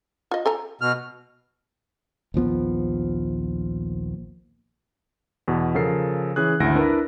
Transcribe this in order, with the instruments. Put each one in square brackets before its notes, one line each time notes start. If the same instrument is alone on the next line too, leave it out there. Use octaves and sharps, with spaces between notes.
[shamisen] F4 D#5
A4 G#5 A#5
[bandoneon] B2 F6
[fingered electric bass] A#1 D#2 F3 B3
[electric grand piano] E2 B2
C#3 F3 A4 A#4 C7
E3 C#4 G#4 F#6
G#1 D2 E4 A#6 D7
D4 E4 A#4 B4